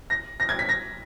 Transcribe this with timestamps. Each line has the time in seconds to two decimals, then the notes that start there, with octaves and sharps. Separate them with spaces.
0.10 A#6
0.40 A#6
0.49 G#6
0.59 B6
0.69 A#6